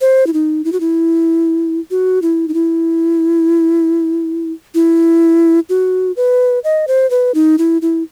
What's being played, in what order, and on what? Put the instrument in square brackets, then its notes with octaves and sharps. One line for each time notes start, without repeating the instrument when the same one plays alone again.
[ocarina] C5
E4
D#4
E4
F#4
E4
F#4
E4
D#4
E4
E4
F#4
B4
D#5
C5
B4
D#4
E4
E4